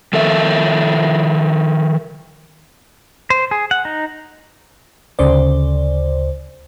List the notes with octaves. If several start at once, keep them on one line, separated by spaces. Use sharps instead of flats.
D#3 F3 A4 A#4 E5
C5
G#4
F#5
D#4
D2 C#3 C5 D5